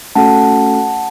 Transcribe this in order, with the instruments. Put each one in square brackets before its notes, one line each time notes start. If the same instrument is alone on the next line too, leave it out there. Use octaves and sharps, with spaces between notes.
[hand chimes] A3 C#4 F#4 A4 F#5 A5